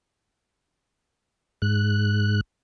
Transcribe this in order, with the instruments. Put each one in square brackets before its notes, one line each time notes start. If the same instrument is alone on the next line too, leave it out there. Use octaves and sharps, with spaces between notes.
[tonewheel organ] G#2 F#6